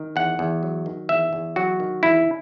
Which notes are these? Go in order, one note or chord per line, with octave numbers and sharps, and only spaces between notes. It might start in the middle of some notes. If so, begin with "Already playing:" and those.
Already playing: D#3
E2 F#5
E2
F#3
D#3
E2 E5
E2
F#3 F#4
D#3
E2 E4